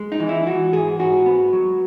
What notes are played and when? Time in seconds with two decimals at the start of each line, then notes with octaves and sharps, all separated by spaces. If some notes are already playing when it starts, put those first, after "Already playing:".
Already playing: G#3
0.12 D#4
0.20 E3
0.29 E4
0.47 E3 F#4
0.73 G#2 G#4
0.99 G#2 F#4
1.26 B3
1.53 F#3